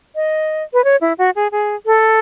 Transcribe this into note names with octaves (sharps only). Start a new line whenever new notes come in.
D#5
B4
C#5
E4
F#4
G#4
G#4
A4